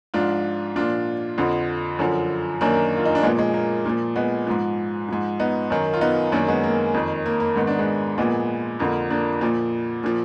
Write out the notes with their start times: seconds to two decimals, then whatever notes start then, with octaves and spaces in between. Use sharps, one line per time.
0.14 G#2 F3 D4 F4
0.76 A#2 F3 D4 F4
1.38 F2 D3 F3
1.99 F#2 D3 F3
2.61 F#2 D#3 A#3 D4
2.97 F4
3.06 D#4
3.15 D4
3.23 A#2 G#3 B3
3.27 F3
3.39 G#3
3.54 A#3
3.85 A#2 F3
4.16 G#3 B3
4.47 G#2 F3
5.09 G#2 F3
5.40 B3 D#4
5.70 F#2 D#3
5.94 F4
6.01 B3 D#4
6.32 F#2 D#3 A#3 D4
6.48 G#3 B3
6.64 A#3
6.94 F2 D#3
7.26 A#3
7.40 A#3
7.56 G#2 D#3 B3
7.67 D4
7.79 G#3 B3
8.18 A#2 F3 G#3 B3
8.79 F2 D3 F3 A#3
9.10 A#3 D4
9.41 A#2 F3
10.03 A#2 F3